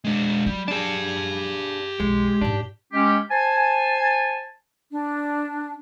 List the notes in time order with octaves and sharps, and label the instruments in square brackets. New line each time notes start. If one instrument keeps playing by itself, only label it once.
[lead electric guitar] G#3 D4
[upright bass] F#3 [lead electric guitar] G3
[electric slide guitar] D4 G#4 [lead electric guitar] G4 A5
[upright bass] B1 F2 [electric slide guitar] G#3
[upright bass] G#2 D#4 [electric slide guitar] D4
[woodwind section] G#3 C#4 G4
C5 G#5 A5
[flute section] D4